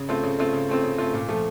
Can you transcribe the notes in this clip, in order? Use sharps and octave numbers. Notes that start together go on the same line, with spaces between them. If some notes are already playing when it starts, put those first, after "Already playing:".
Already playing: C#3
A3 C4 F4
C#3
A3 C4 F4
C#3
A3 C4 F4
C#3
A3 C4 F4
A#2
F3 A3